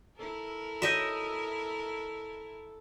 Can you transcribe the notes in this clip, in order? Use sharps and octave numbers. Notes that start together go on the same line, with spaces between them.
E4 A4 A#4
F#4 C#5 D#5 E5